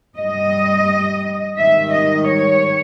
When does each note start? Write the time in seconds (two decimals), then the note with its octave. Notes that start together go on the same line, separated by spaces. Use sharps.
0.16 G2 G3 D#5
1.57 G#2 D#3 G3 E5
1.92 D#5
2.28 C#5